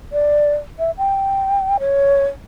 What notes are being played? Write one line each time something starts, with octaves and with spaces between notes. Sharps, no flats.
D5
E5
G5
C#5